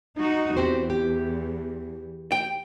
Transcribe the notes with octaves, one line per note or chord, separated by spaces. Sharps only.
D#4 F#4
E2 C4 G4 C5
G4
G5